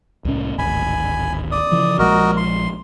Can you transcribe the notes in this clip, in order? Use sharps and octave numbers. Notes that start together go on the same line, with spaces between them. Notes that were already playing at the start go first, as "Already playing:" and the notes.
C2 A2 C#4
D1 G#1 G#5 B5
D5 D#6
C#3 E3 F3
A#1 F3 G#3 F#4 A#4 D#5
C6